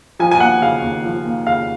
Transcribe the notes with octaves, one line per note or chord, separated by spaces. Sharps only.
F3 G#5
G#5
D#2 F#5
C#3 F5
D#2
F3
D#2
C#3 F5